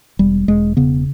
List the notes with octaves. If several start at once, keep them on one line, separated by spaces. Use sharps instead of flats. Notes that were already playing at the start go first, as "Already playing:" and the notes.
E1 G3
E1 G#3
C#3 B3